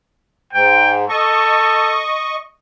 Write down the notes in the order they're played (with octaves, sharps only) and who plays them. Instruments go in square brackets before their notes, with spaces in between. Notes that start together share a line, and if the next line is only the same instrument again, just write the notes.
[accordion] G#2 [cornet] G5
[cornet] A4 [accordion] D#5 C#6